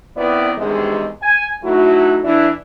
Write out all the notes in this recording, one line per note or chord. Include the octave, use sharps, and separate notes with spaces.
D#3 B3 C4 E4 B4 D5
E2 G2 C3 D#3 G#3
G#5
F#3 A3 D#4 E4 F#4
E3 D4 E4